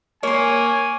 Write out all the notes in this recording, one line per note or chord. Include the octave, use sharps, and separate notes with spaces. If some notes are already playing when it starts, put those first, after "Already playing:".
A#3 C#5 G#5 C6